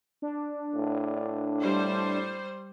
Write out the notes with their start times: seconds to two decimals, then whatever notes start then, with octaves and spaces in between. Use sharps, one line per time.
0.22 D4
0.74 A2
1.62 G3 C5